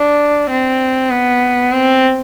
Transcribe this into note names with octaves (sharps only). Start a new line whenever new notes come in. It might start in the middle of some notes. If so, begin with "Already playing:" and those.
Already playing: D4
C4
B3
C4